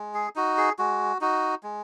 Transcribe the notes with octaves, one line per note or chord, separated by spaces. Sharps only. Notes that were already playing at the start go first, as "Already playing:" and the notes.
Already playing: G#3
G#4
D#4 F#4
G#4
G#3 F#4
D#4 F#4
G#3